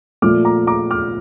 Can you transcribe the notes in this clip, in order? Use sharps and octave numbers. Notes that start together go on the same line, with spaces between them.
A#2 F3 A3 D6 F6
A#5 D6
A#5 D6
D6 F6